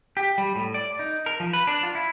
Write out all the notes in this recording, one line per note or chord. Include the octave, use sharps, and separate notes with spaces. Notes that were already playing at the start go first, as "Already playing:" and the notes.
G4
G3
A2
D5
D#4
A#4
F3
B4
D4
F4
E4